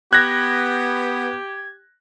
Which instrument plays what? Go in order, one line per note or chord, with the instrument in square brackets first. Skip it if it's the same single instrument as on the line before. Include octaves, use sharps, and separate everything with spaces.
[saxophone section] B3 [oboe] G4 [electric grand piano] F#6 A#6 [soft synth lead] G#6